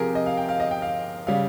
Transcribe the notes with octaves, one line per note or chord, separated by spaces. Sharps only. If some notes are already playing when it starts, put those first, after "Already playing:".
Already playing: C3 F3 C4 G4 G#4 A#4
D#5
F5
G5
F5
D#5
G5
F5
C#3 G3 F5